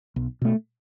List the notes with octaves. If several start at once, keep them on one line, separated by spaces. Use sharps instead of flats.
B1
B2 A3